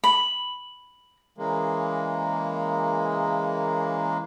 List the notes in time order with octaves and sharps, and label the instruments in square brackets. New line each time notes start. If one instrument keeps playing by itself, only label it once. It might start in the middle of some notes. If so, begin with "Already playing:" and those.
[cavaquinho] B5
[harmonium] C#3 E3 G#3 A#3